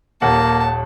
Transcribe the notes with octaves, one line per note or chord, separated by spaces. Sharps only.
D#1 D#2 A#3 F#5 A5